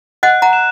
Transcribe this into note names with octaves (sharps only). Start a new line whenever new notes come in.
D#5 F#5 F#6
F#5 A#5
E7